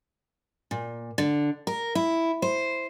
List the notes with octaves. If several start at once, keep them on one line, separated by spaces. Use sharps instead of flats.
A#2
D3
A#4
E4
C5